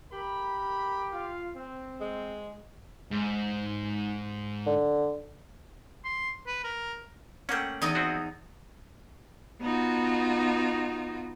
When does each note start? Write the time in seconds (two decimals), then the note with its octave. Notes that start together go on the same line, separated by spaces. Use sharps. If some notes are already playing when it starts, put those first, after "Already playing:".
0.13 G4 A#4 B5
1.13 F4 F5
1.56 C4
2.00 G#3
3.11 G#2
4.66 D3
6.05 C6
6.47 B4
6.64 A#4
7.49 A3 A#3 C#4 F#5 G5
7.82 E2 D#4 D#5
7.95 C4 E4 F#4
9.61 B3 D#4 F4 F#4